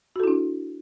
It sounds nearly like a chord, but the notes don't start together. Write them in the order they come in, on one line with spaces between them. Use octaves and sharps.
F#4 A4 E4 D4